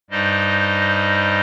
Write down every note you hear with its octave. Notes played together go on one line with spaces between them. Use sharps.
G2 G3 D#4 C5 D#5